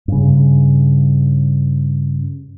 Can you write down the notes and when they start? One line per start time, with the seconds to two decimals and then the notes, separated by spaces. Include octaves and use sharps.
0.08 G2 C#3